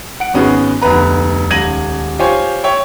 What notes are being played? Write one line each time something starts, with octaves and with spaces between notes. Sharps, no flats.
F#5 D7
G#1 B3 C#4 F#4 G#4
F1 D2 B3 B4 A#5
D#1 C#2 G#6 A#6 D#7 F#7
F4 G4 C5 C#5 G#5
C#5 E5 G5